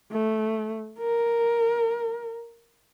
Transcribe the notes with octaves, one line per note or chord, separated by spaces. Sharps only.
A3
A#4